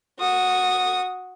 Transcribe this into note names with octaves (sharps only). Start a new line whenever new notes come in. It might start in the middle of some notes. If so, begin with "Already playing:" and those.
F#4 D#6